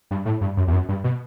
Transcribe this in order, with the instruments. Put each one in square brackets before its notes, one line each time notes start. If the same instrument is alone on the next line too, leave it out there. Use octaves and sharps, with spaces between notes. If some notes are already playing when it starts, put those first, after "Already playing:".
[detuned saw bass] G2
A2
G2
F#2
E2
F#2
G2
B2